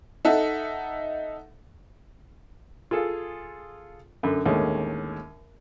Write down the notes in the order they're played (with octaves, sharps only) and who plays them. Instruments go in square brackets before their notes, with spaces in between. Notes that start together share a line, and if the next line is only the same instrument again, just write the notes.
[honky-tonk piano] D#4 A4 E5 F#5
[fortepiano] F4 G#4 A4 F5
F#2 D3
D#2 A2 D3 G#3 C#4